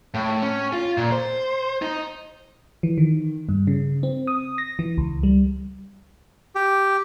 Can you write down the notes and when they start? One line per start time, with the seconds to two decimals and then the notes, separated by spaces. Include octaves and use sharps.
0.14 A2
0.42 C#4
0.73 F4
0.98 A#2
1.11 C5
1.82 D#4
2.83 E3
2.98 D#3
3.49 G2
3.67 C#3
4.03 C4
4.27 D#6
4.58 A#6
4.79 E3
4.98 C#2
5.23 G3
6.55 G4